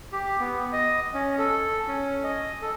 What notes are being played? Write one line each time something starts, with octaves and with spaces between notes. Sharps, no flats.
G4
B3
D#5
C#4
A4
C#4
D#5
A4